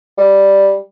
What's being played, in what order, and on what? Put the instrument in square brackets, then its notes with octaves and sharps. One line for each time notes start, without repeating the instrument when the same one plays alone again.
[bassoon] G3